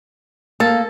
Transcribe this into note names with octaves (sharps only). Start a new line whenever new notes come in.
A#3 A4